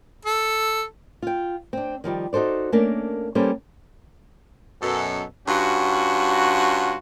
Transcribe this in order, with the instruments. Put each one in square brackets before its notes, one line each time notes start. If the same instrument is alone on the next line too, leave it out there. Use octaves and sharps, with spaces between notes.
[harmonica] A4
[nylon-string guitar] F4 G5
C4 D4
D#3 F3 G3 D5
D#4 F#4 A4 C5 D5
A3 A#3 C#4 D4 A#4 A5
G3 A#3 C#4 A4 C5
[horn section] F#2 B2 A4
G2 C#4 F4 F#4